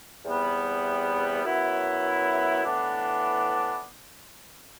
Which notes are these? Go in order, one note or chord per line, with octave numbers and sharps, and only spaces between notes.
E2 C3 G3 B3
F#2 F#3 B3 E4
A2 E3 B3 D4